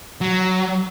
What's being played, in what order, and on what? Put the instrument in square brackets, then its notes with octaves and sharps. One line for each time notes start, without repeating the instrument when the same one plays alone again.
[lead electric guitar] F#3